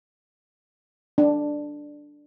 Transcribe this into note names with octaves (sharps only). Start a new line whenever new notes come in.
D4